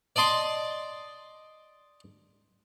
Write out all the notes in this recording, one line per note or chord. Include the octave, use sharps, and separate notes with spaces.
D5 D#5 A5 C6 D6